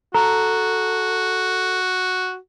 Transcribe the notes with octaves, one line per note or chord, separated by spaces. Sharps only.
F#4 A4 A#5